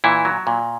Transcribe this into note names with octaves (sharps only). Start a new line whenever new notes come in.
A#2 E3 E4
F#3
A#2